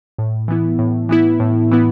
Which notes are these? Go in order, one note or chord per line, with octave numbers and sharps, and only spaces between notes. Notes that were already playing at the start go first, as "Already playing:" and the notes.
A2
E3 B3 E4
A2
E3 B3 E4
A2
E3 B3 E4